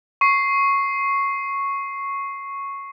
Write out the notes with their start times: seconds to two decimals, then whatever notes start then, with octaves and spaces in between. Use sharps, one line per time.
0.21 C#6 C7